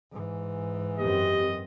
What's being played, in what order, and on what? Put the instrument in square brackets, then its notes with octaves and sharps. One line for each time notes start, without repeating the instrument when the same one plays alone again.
[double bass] G#2 E3
[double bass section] F#2 C4 [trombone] G4 [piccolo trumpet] D#5